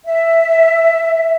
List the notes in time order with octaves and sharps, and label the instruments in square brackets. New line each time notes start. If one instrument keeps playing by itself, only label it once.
[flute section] E5